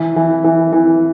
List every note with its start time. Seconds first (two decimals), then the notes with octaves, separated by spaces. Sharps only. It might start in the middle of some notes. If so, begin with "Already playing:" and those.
Already playing: E3
0.16 E3
0.44 E3
0.72 E3